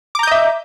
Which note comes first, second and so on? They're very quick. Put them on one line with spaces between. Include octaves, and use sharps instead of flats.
D6 A#5 G6 D#5 E5